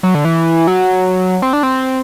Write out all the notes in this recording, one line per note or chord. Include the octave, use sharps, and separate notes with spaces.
F#3
D3
E3
F#3
C4
D4
C4